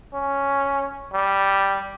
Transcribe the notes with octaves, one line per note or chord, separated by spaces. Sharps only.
C#4
G3